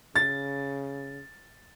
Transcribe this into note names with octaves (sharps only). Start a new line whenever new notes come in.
C#3 A6